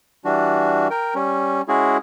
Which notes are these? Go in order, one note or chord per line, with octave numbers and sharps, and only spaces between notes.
E3 G3 D4 F#4
A#4 G5
G3 C#4
G#3 C#4 E4 F#4 G#4